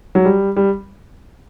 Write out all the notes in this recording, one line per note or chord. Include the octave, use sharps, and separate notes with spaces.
F#3
G3
G3